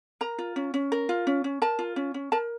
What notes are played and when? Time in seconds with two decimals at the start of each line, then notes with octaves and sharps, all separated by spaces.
0.21 A#4 A#5
0.38 F4
0.56 C#4
0.74 C#4
0.92 A#4
1.09 F4
1.27 C#4
1.44 C#4
1.62 A#4 A5
1.79 F4
1.96 C#4
2.14 C#4
2.32 A#4 A5